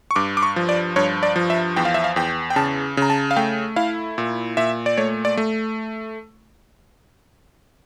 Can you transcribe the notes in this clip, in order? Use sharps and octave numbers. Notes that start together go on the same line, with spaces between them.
C#6
G2 D6
D6
C#6
F3
D5
G2 C#5
D5
F3
E5
E2 G5
F5
E5
F5
E2 G5
G5
C#3 A5
C#3 A#5
A5
F5
A3 G5
E4 F5
A#2
A#2 E5
D5
A3 C#5
D5
A3